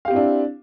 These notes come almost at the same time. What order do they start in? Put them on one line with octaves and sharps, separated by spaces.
F5 G4 C4 E4 D4